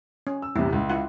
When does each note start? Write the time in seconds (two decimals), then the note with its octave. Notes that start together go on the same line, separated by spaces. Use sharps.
0.27 C#4
0.42 E6
0.56 A1 E2 C3 E4
0.73 C#2
0.90 E4 F4 F#5